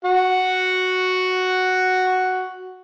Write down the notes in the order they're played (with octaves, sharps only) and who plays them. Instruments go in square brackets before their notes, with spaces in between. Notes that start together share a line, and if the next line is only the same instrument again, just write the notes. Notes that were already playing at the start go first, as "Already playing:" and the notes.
[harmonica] F#4 F#5